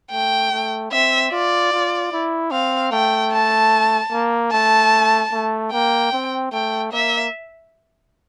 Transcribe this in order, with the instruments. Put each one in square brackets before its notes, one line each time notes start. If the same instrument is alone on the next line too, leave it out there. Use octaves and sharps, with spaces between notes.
[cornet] A3 [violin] G5
[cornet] A3
[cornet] C4 [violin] E5
[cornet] F4 [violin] D5
[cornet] F4
E4
[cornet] C4 [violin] F5
[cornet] A3 [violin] G5
[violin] A5
[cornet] A#3
[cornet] A3 [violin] A5
[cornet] A3
[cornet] A#3 [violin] G5
[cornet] C4
[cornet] A3 [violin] G5
[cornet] A#3 [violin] E5